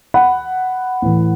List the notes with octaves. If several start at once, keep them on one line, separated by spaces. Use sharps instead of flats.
F#5 B5
A2 E3